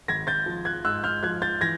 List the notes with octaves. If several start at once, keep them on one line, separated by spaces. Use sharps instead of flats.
G#1 G#6 A#6
G6 A6
F3
F#6 G#6
G#2 E6 F#6
F6 G6
F3 F#6 G#6
G6 A6
E3 G#6 A#6